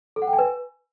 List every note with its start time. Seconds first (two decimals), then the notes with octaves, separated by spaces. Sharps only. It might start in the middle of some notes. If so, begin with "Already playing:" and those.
0.16 A4
0.22 F#5
0.27 G5
0.33 G#5
0.39 B4